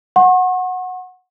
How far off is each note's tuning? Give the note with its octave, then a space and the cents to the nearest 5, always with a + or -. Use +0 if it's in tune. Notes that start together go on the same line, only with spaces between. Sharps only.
F#5 -10 C#6 -45